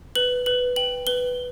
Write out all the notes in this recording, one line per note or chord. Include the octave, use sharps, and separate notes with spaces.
B4 F#7
B4 F#7
G5 F#7
B4 G7